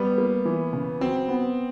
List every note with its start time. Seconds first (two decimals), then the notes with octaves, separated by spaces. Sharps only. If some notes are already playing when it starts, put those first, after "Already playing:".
Already playing: G3 B3
0.18 A#3
0.45 E3
0.73 C#3
1.01 F#3 C4
1.28 B3